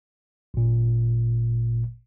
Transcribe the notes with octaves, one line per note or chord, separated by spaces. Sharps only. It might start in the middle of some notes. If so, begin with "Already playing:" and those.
G#1 A#2